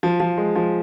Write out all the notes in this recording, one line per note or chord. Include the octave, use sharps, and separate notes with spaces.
F3
F3
G#3
F3